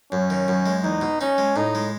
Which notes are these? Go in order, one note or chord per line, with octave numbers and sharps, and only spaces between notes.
F#2 C#4
D#3
F#2
G#3
E2 D#4
B2
C#4 D#4
G#3
A2 D#4
G#3